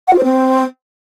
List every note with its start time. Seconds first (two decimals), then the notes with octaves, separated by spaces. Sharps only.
0.07 F#5
0.13 F4
0.18 C5
0.23 C4